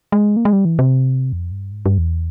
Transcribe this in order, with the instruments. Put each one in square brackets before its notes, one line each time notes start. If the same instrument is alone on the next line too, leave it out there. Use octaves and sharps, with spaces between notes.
[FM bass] G#3
A#3
G#3
G3
E3
C3
F2
G2
G#2
G2
E2